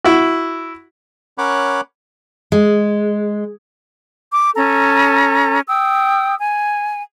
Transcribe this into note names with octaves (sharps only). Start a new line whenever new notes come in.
E4 F#4
C#4 A#4 C#5 F#5 B5 D6
G#3
D6
C#4 A4 A#5
G5 D#6 E6
G#5